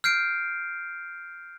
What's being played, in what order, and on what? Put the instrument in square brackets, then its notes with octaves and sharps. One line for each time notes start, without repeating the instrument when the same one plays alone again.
[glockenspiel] F6 G6 C7 D7